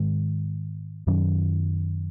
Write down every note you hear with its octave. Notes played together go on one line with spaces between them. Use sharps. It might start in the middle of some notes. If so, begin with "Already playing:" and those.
Already playing: G#2 D#3 G#3
F#2 D#3 F#3 C#4